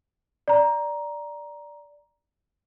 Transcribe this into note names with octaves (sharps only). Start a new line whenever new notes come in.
D5 A#5